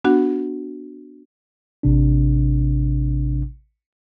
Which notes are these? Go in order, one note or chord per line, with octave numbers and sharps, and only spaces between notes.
B3 D4 F#4 F#5
A1 C3 D4